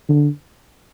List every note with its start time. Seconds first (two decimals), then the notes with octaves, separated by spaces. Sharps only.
0.09 D3